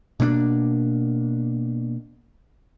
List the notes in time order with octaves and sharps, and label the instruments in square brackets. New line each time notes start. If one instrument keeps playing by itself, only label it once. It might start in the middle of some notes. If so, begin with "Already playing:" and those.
[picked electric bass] B2 A#3 C4 D4